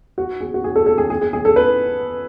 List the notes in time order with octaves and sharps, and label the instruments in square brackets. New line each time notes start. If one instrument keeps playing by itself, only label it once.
[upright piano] F#4
G#4
F#4
G#4
A4
A4
G#4
G#4
G#4
G#4
A4
B4